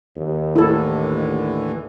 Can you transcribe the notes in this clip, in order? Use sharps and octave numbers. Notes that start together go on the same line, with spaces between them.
D#2
A2 D3 E3 E4 A4